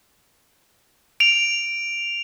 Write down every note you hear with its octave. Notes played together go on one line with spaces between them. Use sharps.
D7 F7